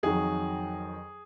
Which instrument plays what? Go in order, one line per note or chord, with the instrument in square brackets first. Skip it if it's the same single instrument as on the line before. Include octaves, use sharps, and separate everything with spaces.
[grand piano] F2 D#3 F#3 G#4